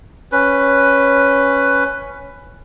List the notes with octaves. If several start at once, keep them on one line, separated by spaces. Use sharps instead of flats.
C#4 B4